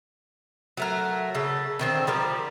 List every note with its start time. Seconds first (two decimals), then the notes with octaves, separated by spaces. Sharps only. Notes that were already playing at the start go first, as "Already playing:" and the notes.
0.77 F#3 A3 A#4
1.35 C#3 A4
1.79 D3 D#3 C4
2.07 F3 G3 A#4